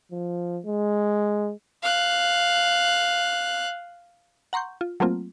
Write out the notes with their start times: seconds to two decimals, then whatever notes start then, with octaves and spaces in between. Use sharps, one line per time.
0.12 F3
0.66 G#3
1.83 F5 F#6
4.53 F#5 A#5 C6 C#6 G6
4.81 F4
5.00 F#3 A3 A#3 C4 F4